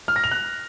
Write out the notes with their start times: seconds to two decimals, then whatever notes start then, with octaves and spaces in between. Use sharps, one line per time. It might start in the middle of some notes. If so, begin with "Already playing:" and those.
0.08 F6
0.16 A#6
0.24 F7
0.31 F#6